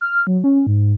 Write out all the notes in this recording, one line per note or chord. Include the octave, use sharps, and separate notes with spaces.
F6
F#3
C#4
G#2